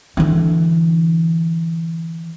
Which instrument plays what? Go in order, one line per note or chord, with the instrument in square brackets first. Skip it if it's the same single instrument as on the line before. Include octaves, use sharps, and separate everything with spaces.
[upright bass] D3 E3